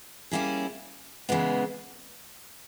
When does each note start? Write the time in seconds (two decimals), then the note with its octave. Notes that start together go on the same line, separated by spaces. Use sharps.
0.31 G3 A#3 C#4 E4 G#4
1.29 C#3 E3 G#3 B3